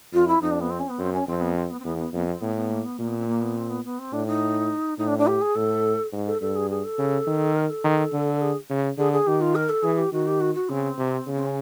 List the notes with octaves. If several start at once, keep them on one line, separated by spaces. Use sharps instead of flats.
F2 F4
E4
F2 D#4
D4
B3
C4
C#4
B3
F#2 C4
C#4
F2 C4
B3
C4
B3
C4
E2 B3
B3
F2 B3
C4
A2 B3
B3
A#3
B3
A#2 A#3
B3
C4
A#3
B3
C4
B3
B3
C4
A2 D4
D#4
A2 D#4
D4
D4
G4
G#4
A2 A4
G#2
A4
G2 A4
G#4
G#4
A4
C#3
D#3
A#4
A4
D#3
D3
G#4
C#3
D3 G#4
G#4
D#3 G4
F4
A#4
A4
E3 G#4
G4
D#3 F#4
G4
F#4
F#4
C#3 C4
C3
C#3
C4
C#4